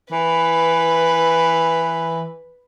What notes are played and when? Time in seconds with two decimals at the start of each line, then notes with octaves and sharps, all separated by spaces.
0.12 E3 B4